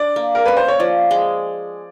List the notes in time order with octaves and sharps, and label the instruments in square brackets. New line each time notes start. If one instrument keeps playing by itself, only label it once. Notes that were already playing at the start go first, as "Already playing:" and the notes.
Already playing: [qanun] D4 [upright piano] D5
[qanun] A#3
[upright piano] A#4
[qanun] C#4 [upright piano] B4
[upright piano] C5
C#5
[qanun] F3 [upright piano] D5
[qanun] G#3